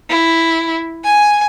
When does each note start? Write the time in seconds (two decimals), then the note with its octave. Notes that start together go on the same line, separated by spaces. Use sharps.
0.10 E4
1.04 G#5